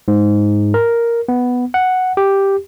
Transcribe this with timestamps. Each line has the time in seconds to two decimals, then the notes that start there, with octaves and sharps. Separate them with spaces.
0.08 G#2
0.74 A#4
1.28 B3
1.74 F#5
2.17 G4